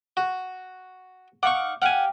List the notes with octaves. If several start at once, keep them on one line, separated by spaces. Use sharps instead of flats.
F#4
D#4 F5 F#5 C#6 D6
G4 F5 F#5 G#5